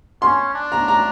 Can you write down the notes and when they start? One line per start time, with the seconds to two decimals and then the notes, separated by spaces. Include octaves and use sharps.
0.22 C#4 C6
0.54 D4
0.72 A#5
0.88 A#5